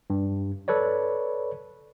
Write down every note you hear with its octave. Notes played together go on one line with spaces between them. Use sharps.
G2
A4 B4 C#5 D5